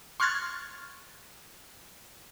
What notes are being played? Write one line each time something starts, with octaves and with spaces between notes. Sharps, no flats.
C6 C#6 F6 F#6 G#6 A6